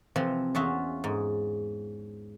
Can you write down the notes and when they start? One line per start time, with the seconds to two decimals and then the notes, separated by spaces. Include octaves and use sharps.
0.16 C3 E3 F3 C4
0.55 E2 C#4 F4 F#4 E5
1.04 G#2